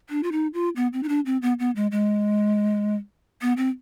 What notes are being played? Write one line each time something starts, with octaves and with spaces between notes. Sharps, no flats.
D4
F4
D#4
F4
B3
C4
D#4
D4
C4
B3
B3
G#3
G#3
B3
C4